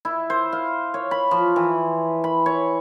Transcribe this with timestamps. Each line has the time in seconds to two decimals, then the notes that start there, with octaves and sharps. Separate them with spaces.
0.05 E4
0.30 C5
0.53 F5
0.94 C#5
1.11 B5
1.31 F3
1.56 E3
2.24 B5
2.46 C#5